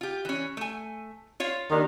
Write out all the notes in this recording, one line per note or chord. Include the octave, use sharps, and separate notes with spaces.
F4 G4
E3 C#4
A3 G#5
F4 C#5 F5
D#2 D#3 D4